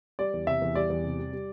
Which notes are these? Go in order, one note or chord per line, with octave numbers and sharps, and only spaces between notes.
G3 D5
E2
C3 E5
E2
G3 D5
E2
C3
G3
G3